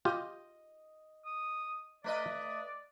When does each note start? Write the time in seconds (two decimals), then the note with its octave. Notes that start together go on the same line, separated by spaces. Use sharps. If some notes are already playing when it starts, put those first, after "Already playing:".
0.05 F4 G4 D#5
1.26 D#6
2.04 A3 B4 D5 D#5